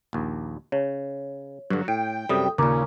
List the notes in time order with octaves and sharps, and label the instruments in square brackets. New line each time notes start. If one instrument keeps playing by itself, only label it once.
[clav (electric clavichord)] A#1 D#2
[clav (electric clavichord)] C#3 [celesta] C#5
[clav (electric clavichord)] G2 D3 [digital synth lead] F#3
[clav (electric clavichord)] A2 [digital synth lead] G5
[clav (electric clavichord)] F#2 C3 G3 [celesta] A4 D#6 [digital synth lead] G5
[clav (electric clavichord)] D#2 A#2 [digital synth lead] C#3 [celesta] A#4 A#5 D6